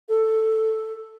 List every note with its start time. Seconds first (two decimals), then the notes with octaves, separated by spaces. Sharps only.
0.08 A4